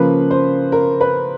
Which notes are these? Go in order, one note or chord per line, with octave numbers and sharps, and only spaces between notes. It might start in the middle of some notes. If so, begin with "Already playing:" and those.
Already playing: C#3 F3 A#3 B4
C5
A#4
B4